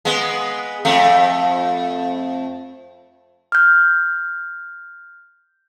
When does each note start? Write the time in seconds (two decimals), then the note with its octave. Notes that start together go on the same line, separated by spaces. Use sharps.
0.05 G#3 B3
0.85 F2 A3
3.52 F6 G6